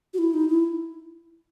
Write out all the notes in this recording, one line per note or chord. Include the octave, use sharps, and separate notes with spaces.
F#4
E4
D#4
E4